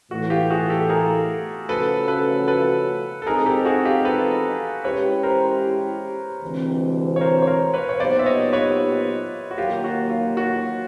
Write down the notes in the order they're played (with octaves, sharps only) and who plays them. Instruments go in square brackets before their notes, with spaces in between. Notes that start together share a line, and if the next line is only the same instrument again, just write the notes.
[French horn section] A2 E3 A3 [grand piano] F#4
[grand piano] F4 G4
F#4 G#4
G4 A4
G#4 A#4
[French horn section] C#3 F3 A3 C#4 F#4 [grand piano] A4 B4
[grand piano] A4 B4
A4 B4
A4
[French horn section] F3 G#3 C4 D#4 [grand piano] G#4 A#4
[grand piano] G#4
G4 A4
F#4 G#4
F4 G4
A4 B4
[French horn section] G#3 C#4 E4 G4 [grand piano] B4 C#5
[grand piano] A#4 C5
[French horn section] D2 C3 E3 G#3 C4
[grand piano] C#5
A#4 C5
C#5
A#4 C5
B4 C#5
C#5
[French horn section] A#2 F#3 B3 D#4 G4 [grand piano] C5 D5
[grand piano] E5
C#5 D#5
B4 C#5
F#4
[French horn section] D#2 D#3 F#3 A#3 [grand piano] F4 G4
[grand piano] F#4
F4
F#4